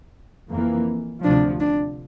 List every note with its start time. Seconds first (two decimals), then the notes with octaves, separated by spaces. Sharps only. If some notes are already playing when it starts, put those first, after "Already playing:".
0.51 F2 E3 A#3
1.24 D2 C3 F3 D4
1.60 D4